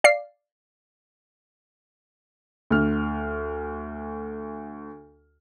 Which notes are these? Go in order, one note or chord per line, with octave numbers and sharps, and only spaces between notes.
D5 F5 C7
D2 F6